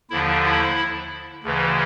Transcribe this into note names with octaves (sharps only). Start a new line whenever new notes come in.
D#2 D3 F3 E4
E4
D2 C#3 E3